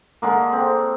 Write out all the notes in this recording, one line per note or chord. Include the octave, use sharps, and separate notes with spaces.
D3 G#3 A#3
C4